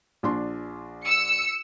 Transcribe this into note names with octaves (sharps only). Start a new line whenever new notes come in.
A#1 D4 C6
E6 C#7